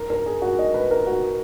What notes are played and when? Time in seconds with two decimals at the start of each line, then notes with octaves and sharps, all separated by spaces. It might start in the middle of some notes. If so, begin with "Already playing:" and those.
Already playing: A#4
0.10 A#4
0.26 G#4
0.42 F#4
0.59 D#5
0.74 B4
0.91 A#4
1.07 F#4